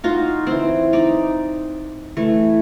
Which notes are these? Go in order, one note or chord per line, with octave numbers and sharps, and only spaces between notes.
D#4 F4 F#4
E3 C4
D#4 D5
E3 A3